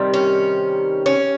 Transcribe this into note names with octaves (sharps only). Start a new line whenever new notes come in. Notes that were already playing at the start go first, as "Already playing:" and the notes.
Already playing: C3 D#3 G3
C#4
C#4